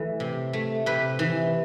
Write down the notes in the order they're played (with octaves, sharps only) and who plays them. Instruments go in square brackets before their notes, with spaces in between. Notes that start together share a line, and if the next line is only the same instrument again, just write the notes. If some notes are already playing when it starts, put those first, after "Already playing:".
Already playing: [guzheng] E3 A3 A4
C3
A3
C3 B4
E3